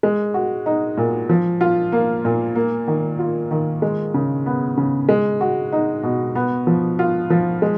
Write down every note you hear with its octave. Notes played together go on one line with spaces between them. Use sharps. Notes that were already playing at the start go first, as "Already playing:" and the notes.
G#3
F#4
D#4
A#2
F3
F4
A#3
A#2
A#3
D#3
F4
D#3
G#3
C#3
B3
C#3
G#3
F#4
D#4
B2
B3
F3
F4
F3
G#3